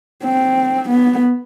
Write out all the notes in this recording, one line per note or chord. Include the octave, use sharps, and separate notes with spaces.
C4
B3